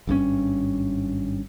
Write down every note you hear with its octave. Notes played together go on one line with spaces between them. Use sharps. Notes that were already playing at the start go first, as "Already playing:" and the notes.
G#1 G2 B2 C#4